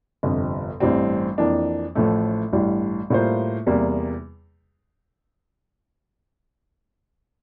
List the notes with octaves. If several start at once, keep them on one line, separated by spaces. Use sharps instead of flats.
G1 F2 C3
A1 G2 E3 G3 C4
F2 E3 A#3 D4
A1 A2 F3 A3
A1 G2 E3 G3
A2 G3 A#3 F4 C5
E2 C3 G3 A#3